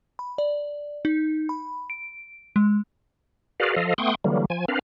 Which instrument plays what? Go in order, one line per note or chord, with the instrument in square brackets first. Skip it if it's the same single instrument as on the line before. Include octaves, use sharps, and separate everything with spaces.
[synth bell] B5
D5
D#4
B5
D7
G#3
[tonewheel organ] F#4 G#4 A#4 B4 D5 F5
F3 A4 D#5 F5
A3 B3 G5 C6 C#6 D#6
D3 E3 F#3 G3 A#3
F3 G#5
C4 D4 A#4 B4 F5